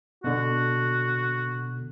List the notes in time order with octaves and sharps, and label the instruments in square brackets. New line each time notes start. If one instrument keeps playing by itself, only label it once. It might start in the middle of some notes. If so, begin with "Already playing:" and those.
[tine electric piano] B2 D3 [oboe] F#4